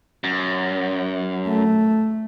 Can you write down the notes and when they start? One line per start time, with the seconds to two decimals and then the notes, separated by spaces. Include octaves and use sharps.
0.24 F#2
1.47 A3